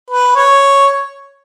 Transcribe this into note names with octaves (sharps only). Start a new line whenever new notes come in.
B4
C#5